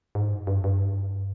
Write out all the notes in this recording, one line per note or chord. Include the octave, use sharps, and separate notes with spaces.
G#2
G2
G2
G2